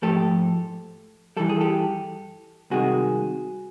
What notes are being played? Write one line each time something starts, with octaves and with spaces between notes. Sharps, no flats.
G#2 F3 A3 G4 A4
G2 E3 G3 A4
G#4
G4 A4
C2 C3 D#3 G#3 F#4 G#4